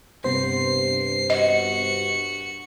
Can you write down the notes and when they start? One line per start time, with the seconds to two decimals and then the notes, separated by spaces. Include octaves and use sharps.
0.24 G2 C3 B3 C5 C7
1.30 F#4 D#5 C#7